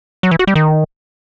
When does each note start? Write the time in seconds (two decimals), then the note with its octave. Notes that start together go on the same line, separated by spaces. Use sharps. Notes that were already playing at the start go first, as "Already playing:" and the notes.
0.23 F#3
0.31 E3
0.39 F#4
0.47 G3
0.55 D#3